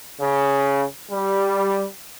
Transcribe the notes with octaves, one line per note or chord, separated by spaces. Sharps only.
C#3
G3